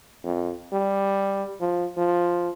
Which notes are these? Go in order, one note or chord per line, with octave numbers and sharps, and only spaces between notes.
F2
G3
F3
F3